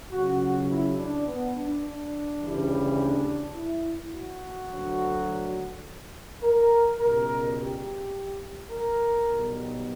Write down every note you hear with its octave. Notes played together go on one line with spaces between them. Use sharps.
C#2 C#3 F#3 F#4
F#4
E4
D4
B3
D4
D4
D2 C#3 E3 G3
D4
E4
F#4
D2 D3 F#3
A#4
C#2 B2 G3 A#4
G4
A#4
B1 B2 G3